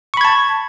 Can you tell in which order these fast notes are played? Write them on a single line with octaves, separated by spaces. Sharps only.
C#6 B5 G#6 A5